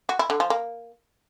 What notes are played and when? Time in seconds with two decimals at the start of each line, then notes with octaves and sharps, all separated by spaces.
0.09 F#4
0.19 E4
0.30 D3
0.40 F3
0.50 A#3